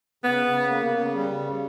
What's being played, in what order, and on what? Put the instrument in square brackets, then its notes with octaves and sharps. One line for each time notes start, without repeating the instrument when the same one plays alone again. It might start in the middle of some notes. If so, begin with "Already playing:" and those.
[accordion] C#3 [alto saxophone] B3
[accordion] C#3
A#3
C#3
G3
C#3